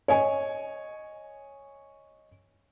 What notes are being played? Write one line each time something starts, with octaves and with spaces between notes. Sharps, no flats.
C#5 D#5 G#5